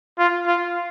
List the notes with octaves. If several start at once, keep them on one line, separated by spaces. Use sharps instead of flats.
F4
F4